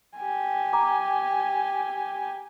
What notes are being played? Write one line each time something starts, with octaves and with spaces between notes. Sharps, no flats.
G4 G#5
A#5 D6